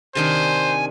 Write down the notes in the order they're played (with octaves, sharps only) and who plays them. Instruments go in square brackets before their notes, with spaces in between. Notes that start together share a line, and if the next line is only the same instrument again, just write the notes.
[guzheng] C3 D#3 D4 [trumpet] C5 [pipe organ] G#5